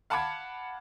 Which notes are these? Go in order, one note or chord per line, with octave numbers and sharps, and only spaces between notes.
F5 F#5 A5 B5 D6 G#6